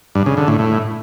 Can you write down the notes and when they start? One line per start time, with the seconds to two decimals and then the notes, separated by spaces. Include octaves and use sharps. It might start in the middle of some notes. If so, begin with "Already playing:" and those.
0.15 G2
0.26 C#3
0.37 D3
0.48 A2
0.59 A2